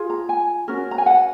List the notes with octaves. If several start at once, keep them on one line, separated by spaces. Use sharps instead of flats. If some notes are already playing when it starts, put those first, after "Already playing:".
Already playing: F4 G#4
A#5
G#5
C#4 F#4 A#4
A#5
G#5
F#5